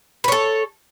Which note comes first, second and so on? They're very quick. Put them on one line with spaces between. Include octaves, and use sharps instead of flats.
B4 C#5 A4